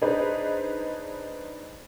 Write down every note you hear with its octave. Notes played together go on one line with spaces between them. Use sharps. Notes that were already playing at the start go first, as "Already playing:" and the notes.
D4 D#4 G#4 B4 C5